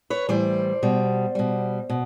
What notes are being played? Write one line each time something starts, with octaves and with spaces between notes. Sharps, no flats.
B4 C#5
A2 E3 G3 C5 D5
B2 G3
B2 G3
B2